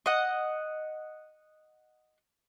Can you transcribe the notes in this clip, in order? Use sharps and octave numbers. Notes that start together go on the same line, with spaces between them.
D#5 F#5